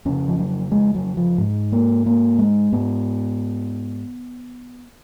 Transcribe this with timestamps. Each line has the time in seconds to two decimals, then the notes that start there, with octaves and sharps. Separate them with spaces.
0.05 F2 C#3 C#4
0.28 F3
0.39 F#3
0.72 G#3
0.95 F#3
1.17 F3
1.38 G#2
1.72 A#3
2.06 A#3
2.39 G#3
2.72 G#2 B3